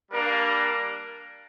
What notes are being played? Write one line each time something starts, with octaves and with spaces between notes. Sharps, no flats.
G3 A#3 D4 A#4